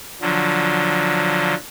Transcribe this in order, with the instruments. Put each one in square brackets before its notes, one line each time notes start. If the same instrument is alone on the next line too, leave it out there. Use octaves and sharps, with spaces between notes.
[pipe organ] D3 F3 F#3